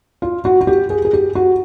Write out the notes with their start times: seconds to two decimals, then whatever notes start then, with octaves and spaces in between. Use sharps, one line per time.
0.22 F4
0.45 F#4
0.61 F#4
0.67 G4
0.90 G#4
1.05 G#4
1.13 G4
1.35 F#4